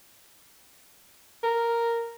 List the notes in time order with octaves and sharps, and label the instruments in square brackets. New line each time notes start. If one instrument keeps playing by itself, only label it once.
[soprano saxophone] A#4